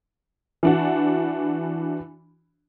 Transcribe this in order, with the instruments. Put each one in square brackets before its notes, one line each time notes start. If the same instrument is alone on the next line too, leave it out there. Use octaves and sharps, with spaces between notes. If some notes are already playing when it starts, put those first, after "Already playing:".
[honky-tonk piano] E3 D4 F#4